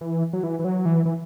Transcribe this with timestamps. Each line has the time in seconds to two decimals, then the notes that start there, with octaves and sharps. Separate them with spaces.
0.01 E3
0.33 F#3
0.43 E3
0.59 E3
0.65 F#3
0.86 E3
1.05 E3